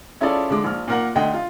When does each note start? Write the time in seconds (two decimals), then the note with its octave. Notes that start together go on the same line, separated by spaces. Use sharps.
0.21 C#4 E4 F4 G#4 A4 D5
0.50 D3 G#3 D6
0.64 A#1 F6
0.88 A#2 A#4 F#5
1.15 D2 D3 D#5 F#5 G5
1.33 F4